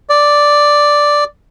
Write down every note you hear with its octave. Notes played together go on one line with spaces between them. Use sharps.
D5